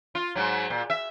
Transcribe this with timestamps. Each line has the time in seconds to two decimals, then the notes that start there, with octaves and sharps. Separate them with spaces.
0.15 F4
0.35 G#2 F#3
0.70 A#2
0.90 E5